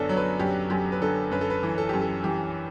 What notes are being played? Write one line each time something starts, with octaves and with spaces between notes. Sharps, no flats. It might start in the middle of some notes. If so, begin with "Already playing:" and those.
Already playing: F#2 D3 B3 D4 A4
F#3
B4
F#2 G4
F#2 G4
B4
D3 A4
F#2 B4
A4
B4
E3
A4
F#2 G4
A4
E3 G4